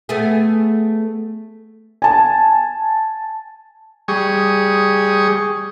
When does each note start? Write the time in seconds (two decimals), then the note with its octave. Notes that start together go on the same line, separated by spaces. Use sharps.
0.09 A3 B3 G#4
2.02 G#5 A5
4.08 G3 G#4 C#6 D#6